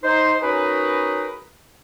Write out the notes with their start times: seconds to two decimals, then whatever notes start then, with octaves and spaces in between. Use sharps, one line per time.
0.03 D#4 C5
0.42 C#4 D#4 F#4 G#4 A#4 B4